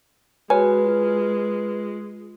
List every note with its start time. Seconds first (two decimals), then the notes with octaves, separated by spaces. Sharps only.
0.50 G#3 F#4 B4 C#5 G#5
0.84 F4